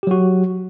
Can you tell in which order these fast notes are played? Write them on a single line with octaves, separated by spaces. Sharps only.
G4 F#3 F#4